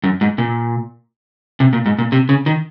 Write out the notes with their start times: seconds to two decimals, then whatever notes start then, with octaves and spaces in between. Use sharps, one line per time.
0.04 F#2
0.21 G#2
0.38 A#2
1.60 C3
1.73 A#2
1.86 G#2
1.98 A#2
2.12 C3
2.29 C#3
2.46 D#3